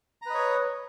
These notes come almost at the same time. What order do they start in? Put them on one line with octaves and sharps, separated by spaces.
A#5 B4 D#5 C#5